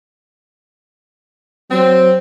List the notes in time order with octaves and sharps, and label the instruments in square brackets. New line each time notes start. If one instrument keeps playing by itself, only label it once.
[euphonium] F#3 [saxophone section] C4